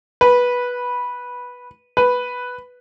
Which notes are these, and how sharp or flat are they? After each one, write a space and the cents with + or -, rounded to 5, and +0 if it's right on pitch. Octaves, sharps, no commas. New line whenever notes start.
B4 -10
B4 +0